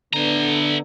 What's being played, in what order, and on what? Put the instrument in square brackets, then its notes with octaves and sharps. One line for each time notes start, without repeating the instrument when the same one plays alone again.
[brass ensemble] D3 B3 D4 [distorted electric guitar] E4 A#5